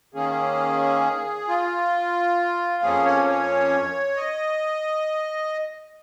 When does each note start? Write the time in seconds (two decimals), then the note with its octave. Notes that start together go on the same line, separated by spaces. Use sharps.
0.14 D#3 A#3 C#4 G#4
1.48 F4
2.82 F2 F3 A#3 C#4 G#4
3.05 C#5
3.28 C#5
4.17 D#5